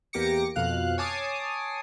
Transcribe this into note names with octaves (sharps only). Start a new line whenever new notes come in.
E2 A#3 G4 D6 A#6 C#7
F2 B2 F5 F#6
C#5 G#5 A5 D6 D#6 C7